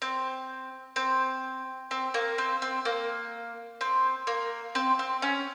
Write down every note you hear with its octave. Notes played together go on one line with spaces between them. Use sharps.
C4
C4
C4
A#3
C4
C4
A#3
C4
A#3
C4
C4
C#4